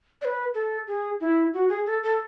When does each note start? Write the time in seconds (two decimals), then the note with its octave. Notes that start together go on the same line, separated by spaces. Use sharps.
0.22 D5
0.25 B4
0.55 A4
0.87 G#4
1.21 E4
1.54 F#4
1.69 G#4
1.86 A4
2.03 A4